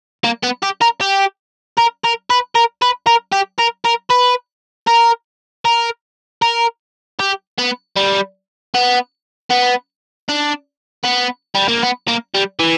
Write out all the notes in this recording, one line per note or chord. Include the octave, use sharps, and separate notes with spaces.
A#3
B3
G4
A#4
G4
A#4
A#4
B4
A#4
B4
A#4
G4
A#4
A#4
B4
A#4
A#4
A#4
G4
B3
G3
B3
B3
D4
B3
G3
A#3
B3
A#3
G3
E3